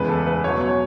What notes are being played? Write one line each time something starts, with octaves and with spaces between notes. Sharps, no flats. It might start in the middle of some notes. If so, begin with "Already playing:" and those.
Already playing: E2 C#3 G#3 B4
A4
B4
B2 F#3 B3 C#5
C#5